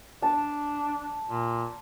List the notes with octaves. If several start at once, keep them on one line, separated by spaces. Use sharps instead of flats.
D4 A5
A#2